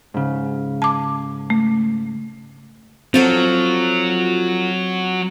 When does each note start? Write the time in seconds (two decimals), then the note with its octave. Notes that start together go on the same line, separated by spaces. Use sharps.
0.14 G#2 C#3
0.82 A5 D6
1.50 A3
3.14 F3 F#3 C4 F4 A4